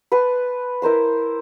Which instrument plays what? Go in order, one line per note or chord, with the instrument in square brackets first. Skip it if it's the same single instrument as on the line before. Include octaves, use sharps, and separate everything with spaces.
[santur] B4 A5 C6
E4 A#4 C5 C6